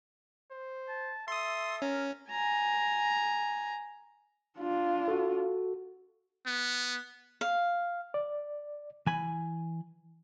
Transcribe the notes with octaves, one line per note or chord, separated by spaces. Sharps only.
C5
A5
A4 E5 C6 D#6
C#4 A#4
G#5 A#5
D4 F4
F#4 A4
B3
F5
D5
E3 G#5 B5